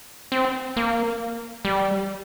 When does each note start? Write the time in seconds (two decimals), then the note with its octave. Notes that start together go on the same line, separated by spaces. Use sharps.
0.32 C4
0.77 A#3
1.65 G3